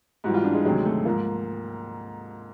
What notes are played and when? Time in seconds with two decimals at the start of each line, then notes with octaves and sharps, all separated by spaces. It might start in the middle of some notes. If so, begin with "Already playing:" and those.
0.24 G#2 E3 G3 F#4
0.34 F4
0.44 D4
0.54 G#3
0.65 D2 C3 D#3 F#3 G#3
0.85 A3
1.05 G#2 F3 A#3